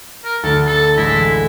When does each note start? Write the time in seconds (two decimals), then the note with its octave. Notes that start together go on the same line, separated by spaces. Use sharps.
0.24 A#4
0.43 D2 A4
0.66 A4
0.97 A1 G#3 E4 A#6